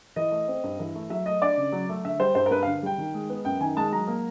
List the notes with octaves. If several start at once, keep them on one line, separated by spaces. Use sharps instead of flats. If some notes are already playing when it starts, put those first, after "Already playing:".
E3 D#5
A3
C4
G2
E3
A3
F#3 E5
A3 D#5
D4 D5
C#3
F#3
A3
D3 E5
G3 C5
G2 C5
A#4
G2 B4
F5
D3
G3 G5
D#3
G#3
B3
F#2 G5
D#3 G#5
G#3 A5
F#3 A#5
A#3